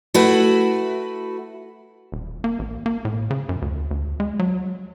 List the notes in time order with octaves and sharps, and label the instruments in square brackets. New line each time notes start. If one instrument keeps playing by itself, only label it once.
[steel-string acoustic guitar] A3 E4 F#4 B4
[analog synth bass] D#1
A#3
A1
A#3
A2
C#3
F#2
D2
D2
G#3
F#3